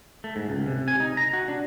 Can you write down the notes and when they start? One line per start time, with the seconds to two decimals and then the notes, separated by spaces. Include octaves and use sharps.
0.24 A3
0.36 G#2
0.49 C#2
0.68 C3
0.88 G#5
1.00 D#4
1.17 A#5
1.33 F#4
1.48 D4